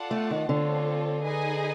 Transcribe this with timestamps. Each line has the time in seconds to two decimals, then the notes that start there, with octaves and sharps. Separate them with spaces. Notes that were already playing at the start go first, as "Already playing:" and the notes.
Already playing: F4 A4 D5 F#5 A5
0.11 A3
0.31 D#3
0.48 D3 C4 F4 A4 C#5
1.24 D#4 G#4 B4 D#5 G#5